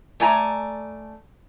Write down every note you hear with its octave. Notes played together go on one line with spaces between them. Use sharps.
A3 D5 G#5 A#5